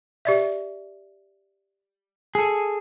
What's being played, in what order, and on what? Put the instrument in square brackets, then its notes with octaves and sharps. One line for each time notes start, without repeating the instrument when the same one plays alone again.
[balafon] G4 D5 E5
[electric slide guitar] G#4 A4